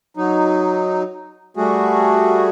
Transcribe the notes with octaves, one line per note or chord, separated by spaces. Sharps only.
F#3 D#4
G3 A3 F#4 G#4